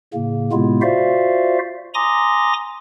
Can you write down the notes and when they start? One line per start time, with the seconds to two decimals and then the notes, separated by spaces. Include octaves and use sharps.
0.13 A2 C#3 A#3
0.52 A2 C3 G#3 B3 E4 F4
0.82 F4 F#4 C5 D5 E5 F5
1.94 G#5 A#5 C6 D6 D#6 A#6